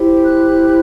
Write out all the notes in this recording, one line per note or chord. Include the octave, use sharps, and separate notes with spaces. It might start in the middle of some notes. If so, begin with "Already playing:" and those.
Already playing: E4 G4 C5
F#6